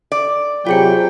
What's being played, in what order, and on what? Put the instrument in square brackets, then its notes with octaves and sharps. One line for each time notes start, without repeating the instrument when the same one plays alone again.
[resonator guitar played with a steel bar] D5
[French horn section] C3 F#3 [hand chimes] F4 G#4 C#7 [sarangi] G5